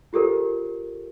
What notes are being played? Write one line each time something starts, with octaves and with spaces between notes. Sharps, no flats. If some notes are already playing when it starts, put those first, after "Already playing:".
F4 G4 A4 A#4 C5